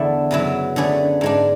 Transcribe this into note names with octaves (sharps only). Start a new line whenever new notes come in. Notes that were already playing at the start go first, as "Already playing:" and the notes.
Already playing: E2 D3 A3 E4
F#2 C#3 F#3 B3 E4
D3 A3 C#4 G#4 B4
G#2 G#3 D4